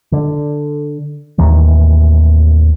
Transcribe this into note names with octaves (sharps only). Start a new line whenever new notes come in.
D3
D#2 A2 D#3 E3